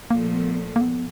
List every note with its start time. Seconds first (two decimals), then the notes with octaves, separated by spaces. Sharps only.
0.10 A#2 F3 A3 A#3
0.34 B3
0.76 A#3
0.81 B3